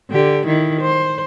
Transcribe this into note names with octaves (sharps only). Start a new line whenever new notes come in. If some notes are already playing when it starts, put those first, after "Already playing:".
D3 G4
D#3 E4
C5